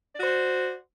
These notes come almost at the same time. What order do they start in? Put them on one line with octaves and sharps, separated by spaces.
D5 F#4 C5